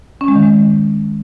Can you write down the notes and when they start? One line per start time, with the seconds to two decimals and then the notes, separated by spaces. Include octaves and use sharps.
0.21 C#4
0.28 G#3
0.36 D#3
0.43 G#3